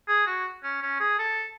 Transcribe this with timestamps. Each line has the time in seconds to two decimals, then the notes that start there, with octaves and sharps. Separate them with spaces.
0.08 G#4
0.27 F#4
0.64 C#4
0.82 C#4
1.00 G#4
1.19 A4